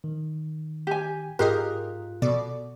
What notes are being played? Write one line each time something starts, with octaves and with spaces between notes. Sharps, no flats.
D#3
G4 G#5
G#2 F4 G4 G#4 A#4 D#5 F#6
B2 A4 D5